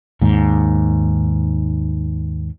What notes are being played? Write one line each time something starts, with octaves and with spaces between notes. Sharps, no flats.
D#2 G#2